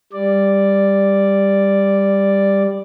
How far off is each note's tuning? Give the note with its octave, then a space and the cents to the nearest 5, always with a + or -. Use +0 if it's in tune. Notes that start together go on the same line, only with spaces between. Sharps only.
G3 +15 D5 +0